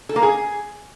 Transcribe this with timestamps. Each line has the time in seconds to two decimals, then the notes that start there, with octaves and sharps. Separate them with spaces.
0.09 A4
0.16 A#3
0.22 G#4